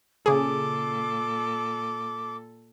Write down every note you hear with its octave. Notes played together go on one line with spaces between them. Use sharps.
A#2 C#3 G#4 A4 D6